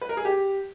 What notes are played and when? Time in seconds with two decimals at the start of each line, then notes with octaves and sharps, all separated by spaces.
0.01 B4
0.09 A#4
0.17 G#4
0.25 G4